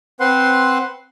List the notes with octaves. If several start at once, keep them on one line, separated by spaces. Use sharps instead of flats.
C4 B4 C5 F#5 C6